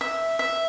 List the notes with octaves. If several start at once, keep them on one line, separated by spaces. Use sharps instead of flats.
E5
E5